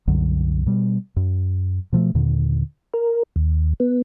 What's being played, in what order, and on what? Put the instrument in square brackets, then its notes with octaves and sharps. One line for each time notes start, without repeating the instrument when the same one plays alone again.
[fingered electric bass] C2 F#2 D3 F#3
B2 G3
F#2
B2 F3 F#3 A3
D#2 A#2 D3
[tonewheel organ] A#4
D#2
B3